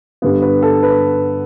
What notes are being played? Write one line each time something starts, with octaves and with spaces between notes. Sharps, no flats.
G2 D3 G3 B3
B4
A4
B4